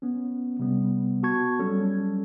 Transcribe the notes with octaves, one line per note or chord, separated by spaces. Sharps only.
B3 C#4
C3 G3 B3
B3 F#4 A5 C#6 G#6
F#3 G3 C#4 A4